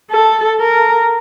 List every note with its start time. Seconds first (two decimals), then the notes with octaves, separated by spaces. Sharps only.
0.11 A4
0.60 A#4